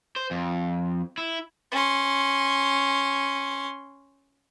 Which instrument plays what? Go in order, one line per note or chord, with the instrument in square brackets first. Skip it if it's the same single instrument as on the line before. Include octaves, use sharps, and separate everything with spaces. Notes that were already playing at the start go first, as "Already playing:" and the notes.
[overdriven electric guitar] C5
F2
E4
[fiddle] C#4 C6